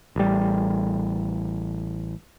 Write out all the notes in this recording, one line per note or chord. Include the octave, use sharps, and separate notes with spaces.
A1 G3